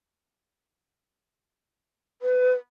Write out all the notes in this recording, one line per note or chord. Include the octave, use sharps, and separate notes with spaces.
B4